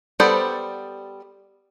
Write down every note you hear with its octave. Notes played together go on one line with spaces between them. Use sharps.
G3 B3 A4 C5 D5